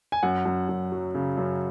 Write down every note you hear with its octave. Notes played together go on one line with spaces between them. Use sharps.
G#5
F#2 F#5
F#2
F#2
F#3
C#3
F#2